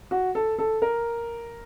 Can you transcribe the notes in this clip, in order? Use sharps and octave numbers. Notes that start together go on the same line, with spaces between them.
F#4
A4
A4
A#4